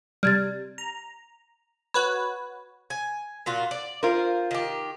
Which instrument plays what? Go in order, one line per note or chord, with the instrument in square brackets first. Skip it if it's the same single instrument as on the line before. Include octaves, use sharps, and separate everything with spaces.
[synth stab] C3 G3 [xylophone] F6 G#6 A6
[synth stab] A#5
[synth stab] F#4 B4 C#5 [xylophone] B5
[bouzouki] G#5
A#2 F4 F#4
D5
[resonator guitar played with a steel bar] F4 A#4 [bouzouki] C5
[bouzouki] D#3 G4